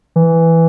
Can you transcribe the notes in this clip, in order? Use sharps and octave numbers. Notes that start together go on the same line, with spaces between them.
E3